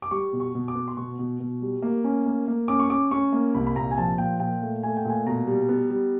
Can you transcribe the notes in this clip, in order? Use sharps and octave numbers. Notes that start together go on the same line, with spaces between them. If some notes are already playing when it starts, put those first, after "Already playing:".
D6
G3 C#6
B2
C#6
B2
D6
B3
C6
B2 C#6
B2
B2
G3
A#3
C#4
A#3
A#3
C#4 D6
C#6
C#4 D6
C#4 C#6
A#3
C2 B5
B5
A#2 A#5
G#5
F3 A5
A#2 G5
A#2 G5
A3
A3 G#5
G5
A#2 G#5
B2 A#5
G3
B3
G3